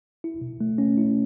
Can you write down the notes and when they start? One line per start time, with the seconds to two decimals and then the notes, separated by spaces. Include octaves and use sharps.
0.24 E4
0.41 B2
0.61 A3
0.78 C#4
0.97 E4